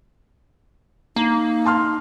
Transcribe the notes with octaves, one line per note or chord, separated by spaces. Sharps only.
A#3 D#4 A#5
A5 C6 F6